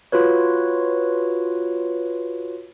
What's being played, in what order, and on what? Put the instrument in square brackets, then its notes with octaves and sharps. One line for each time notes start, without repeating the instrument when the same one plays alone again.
[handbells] F4 F#4 B4 C#5